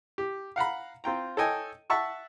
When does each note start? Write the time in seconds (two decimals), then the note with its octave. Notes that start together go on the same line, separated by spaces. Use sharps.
0.18 G4
0.56 F5 F#5 A#5 B5
1.04 C4 F4 G5 A#5
1.37 A4 C#5 D#5 G5 G#5
1.90 E5 F#5 A5 C#6 E6